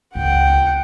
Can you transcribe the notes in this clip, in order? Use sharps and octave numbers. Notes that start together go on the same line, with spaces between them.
C#2 F#5 G5